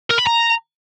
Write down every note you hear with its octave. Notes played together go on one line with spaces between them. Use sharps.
A#4
B5
A#5